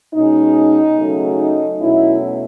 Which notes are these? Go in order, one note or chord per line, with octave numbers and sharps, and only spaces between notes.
B2 G#3 C#4 D#4
C#3 F#3 A3 C#4
D#4
E2 B2 F#3 A3 C#4 E4